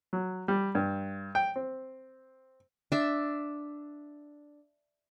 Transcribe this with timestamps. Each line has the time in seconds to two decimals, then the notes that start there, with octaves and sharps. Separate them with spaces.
0.13 F#3
0.48 G3
0.75 G2
1.35 G5
1.56 C4
2.92 D4 E5